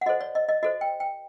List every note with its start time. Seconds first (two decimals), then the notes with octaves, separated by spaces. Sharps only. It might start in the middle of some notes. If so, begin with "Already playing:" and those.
0.01 F#5
0.06 F#4 A4 C5 D#5
0.21 D5
0.35 D#5
0.49 D#5
0.63 F#4 A4 C5 D#5
0.81 G5
1.00 G5